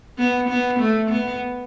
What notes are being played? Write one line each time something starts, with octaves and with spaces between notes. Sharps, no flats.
B3
B3
A3
B3